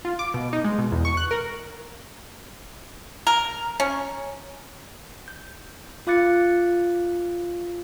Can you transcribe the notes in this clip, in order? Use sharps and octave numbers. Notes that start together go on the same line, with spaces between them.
F4
D6
B2
D#4
G#3
B2
E2
C#6
F#6
A#4
A#4
C#4
G6
F4 F5 D6 F#6 A6 C#7